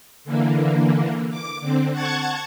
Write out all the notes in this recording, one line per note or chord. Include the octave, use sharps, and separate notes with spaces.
D3 E3 A#3
D6
D3 C4
F#5 A5 C#6 G#6